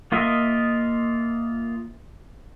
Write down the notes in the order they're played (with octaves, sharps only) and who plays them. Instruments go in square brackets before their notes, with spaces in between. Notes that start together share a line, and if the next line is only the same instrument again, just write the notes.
[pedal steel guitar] A#3 F4 A#4 D#5 E5